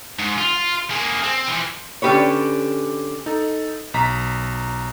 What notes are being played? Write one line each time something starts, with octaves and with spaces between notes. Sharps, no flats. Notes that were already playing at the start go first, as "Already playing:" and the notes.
G#2
F4
A#3 G#4
C4
E3 F3
D3 C#4 D#4 G4 B4 C#5
D#4 A4
B1 A#5 B6